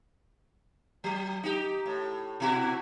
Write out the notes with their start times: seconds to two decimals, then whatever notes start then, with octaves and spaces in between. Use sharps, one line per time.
1.04 F#3
1.43 D#4 G4
1.85 A2
2.40 B2 E4 F#4